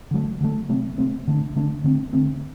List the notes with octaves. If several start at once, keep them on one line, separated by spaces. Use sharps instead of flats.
D3 F#3 A3
D3 F#3 A3
C3 F#3 A3 C4
C3 F#3 A3 C4
D3 A3 D4
D3 A3 D4
D3 A3 C4
D3 A3 C4